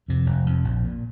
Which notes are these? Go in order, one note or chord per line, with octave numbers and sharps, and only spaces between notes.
F2 C3
F1
F2 C3
A#1
A#2